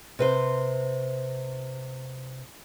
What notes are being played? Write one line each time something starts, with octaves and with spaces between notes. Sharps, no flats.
C3 B4 C5